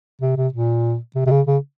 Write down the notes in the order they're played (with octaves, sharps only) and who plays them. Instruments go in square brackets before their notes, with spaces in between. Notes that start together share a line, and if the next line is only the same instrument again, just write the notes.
[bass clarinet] C3
C3
A#2
C3
C3
C#3
C#3